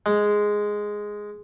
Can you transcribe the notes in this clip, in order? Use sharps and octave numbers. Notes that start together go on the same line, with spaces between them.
G#3